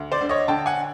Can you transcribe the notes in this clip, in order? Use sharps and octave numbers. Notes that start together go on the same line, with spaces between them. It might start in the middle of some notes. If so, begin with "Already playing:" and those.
Already playing: D2
C5 D5
D3
C#5 D#5
D3 G5 A5
F#5 G#5